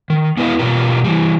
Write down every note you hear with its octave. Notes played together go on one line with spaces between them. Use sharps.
D#3
B3 E4 B4 D#5 F5
B2 F4 G4 A#4
E3 F3 G3